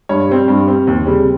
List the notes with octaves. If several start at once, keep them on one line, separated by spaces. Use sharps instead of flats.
G2 C#5
G3 C4
G2
G3 C4
D#2
C#3 G3 C4